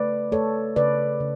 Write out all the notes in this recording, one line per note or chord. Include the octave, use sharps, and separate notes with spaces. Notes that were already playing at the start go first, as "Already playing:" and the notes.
Already playing: C#3 A3 B4 D5
A3 A4 C#5
C#3 B4 D5
C#3